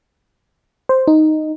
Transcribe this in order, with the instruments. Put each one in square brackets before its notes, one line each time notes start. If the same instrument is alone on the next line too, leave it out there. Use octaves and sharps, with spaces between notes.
[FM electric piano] C5
D#4